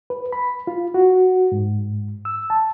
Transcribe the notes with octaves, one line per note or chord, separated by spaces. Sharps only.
B4
B5
F4
F#4
G#2
E6
A5